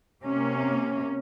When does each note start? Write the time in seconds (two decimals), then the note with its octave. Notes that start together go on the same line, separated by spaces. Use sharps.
0.23 C3 A#3 C#4